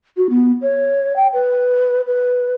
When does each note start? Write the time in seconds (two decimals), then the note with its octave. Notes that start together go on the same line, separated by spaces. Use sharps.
0.17 F#4
0.30 B3
0.62 C#5
1.16 G5
1.33 B4
2.07 B4